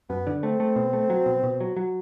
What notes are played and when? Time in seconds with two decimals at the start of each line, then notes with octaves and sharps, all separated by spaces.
0.09 F#2 B3
0.27 D3
0.43 A3 C4
0.60 A3
0.76 B2
0.93 A3
1.10 F#3
1.26 B2
1.43 B2
1.61 F#3
1.77 F#3